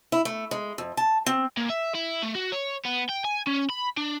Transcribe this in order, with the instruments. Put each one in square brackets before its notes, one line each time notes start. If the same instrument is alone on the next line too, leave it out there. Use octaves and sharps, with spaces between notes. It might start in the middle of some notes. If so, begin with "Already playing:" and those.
[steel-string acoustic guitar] E4
A3
G#3
F2
A5
C4
[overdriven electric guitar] A#2
E5
E4
A3
F#4
C#5
B3
G5
G#5
C#4
B5
D4